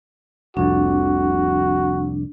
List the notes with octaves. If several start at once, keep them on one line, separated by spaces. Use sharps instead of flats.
F1 C2 F2 D4 F#4